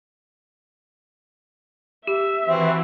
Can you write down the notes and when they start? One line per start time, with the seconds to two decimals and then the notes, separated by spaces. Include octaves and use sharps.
2.07 G4 E5
2.46 E3 C4 F#4